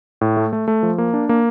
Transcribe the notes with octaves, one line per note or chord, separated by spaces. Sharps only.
A2
A3
A3
A3
F3
A#3
D4
A#3